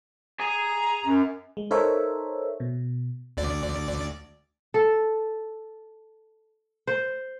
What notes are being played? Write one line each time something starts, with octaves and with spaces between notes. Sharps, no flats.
G#4 G#5 A#5
F#2
G#3
D#4 A4 A#4 C5 C#5 E5
B2
D2 D5
A4
C5